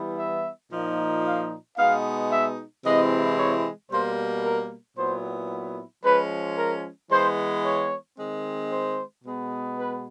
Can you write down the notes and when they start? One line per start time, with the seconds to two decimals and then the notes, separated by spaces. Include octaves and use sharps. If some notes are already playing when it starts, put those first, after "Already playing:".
Already playing: E3 G3 B3 E4
0.18 E5
0.71 A#2 F3 A#3 D#4
1.24 F5
1.77 B2 G#3 B3 D#4 F5
2.31 E5
2.85 C3 E3 G#3 C4 E4 D#5
3.38 C#5
3.91 B2 G3 A#3 C5
4.43 A#4
4.97 A#2 F#3 B3 E4 C5
6.04 F3 G#3 C#4 B4
6.57 A#4
7.11 E3 G#3 B3 C5
7.64 C#5
8.17 D#3 G#3 C4
8.71 C5
9.24 B2 G#3 B3
9.77 B4